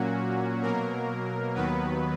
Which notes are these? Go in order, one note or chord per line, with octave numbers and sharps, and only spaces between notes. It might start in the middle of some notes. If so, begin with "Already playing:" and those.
Already playing: A#2 F#3 A#3 C#4 F#4
B2 F#3 A#3 A#4
D#2 D#3 F#3 B3 B4